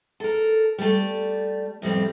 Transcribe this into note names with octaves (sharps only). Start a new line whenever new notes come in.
A4 A#4
G3 A3
F2 A2 G3 C4